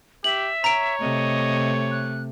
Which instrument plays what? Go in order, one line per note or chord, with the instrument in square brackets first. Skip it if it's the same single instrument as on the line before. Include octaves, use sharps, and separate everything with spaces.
[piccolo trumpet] G4 [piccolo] E5 [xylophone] F#7
[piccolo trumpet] C#5 [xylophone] A#5 D7
[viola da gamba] C3 A3 [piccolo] D#5
[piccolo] F#6